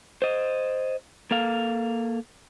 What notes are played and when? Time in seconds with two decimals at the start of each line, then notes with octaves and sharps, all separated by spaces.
0.22 C5 D#5
1.31 A#3 A4 F5